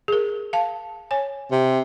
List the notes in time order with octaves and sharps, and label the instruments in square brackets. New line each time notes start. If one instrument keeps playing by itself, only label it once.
[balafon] G#4 A#4
F5 A5
C#5 G#5
[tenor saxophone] C3